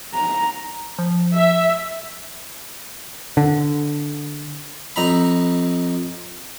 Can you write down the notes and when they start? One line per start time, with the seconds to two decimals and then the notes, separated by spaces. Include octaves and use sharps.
0.15 A#5
0.99 F3
1.35 E5
3.37 D3
4.96 F2 D#4 A#5 B5